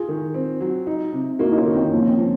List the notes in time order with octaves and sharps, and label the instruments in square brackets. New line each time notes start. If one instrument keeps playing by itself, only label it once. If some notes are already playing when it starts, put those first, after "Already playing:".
Already playing: [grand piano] F4 G#4
[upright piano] D#3
C4
F#3
D#4
C3
[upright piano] A#3 [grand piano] D#4 F#4
[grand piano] D#4
C#4 F4
[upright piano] D#3
[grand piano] C4 D#4
[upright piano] F3 [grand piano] A#3 C#4
[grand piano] C4
[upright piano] F3